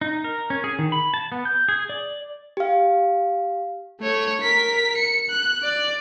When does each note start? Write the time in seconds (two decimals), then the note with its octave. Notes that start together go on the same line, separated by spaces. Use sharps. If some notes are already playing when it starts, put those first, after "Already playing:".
0.01 D#4
0.24 A#4
0.50 C#4
0.64 G#4
0.79 D#3
0.92 B5
1.14 A5
1.32 B3
1.45 G6
1.69 G#4
1.89 D5
2.57 G4 F5
4.01 A3 C#5
4.42 A#4 B6
4.97 C#7
5.30 F#6
5.63 D5